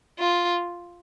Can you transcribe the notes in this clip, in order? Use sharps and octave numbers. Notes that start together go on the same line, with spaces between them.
F4